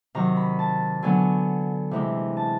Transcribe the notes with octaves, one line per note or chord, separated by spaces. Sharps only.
C3 D#3 F#3 A#5
B5
A5
D3 F#3 B3 G#5
C3 E3 G#3
A5